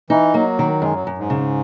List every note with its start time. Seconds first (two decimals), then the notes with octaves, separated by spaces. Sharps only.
0.10 E3 D#4
0.34 F#3 A#3
0.59 D#3
0.82 F#2 G#3
0.94 F#3
1.07 F#2
1.18 G#2
1.30 C#3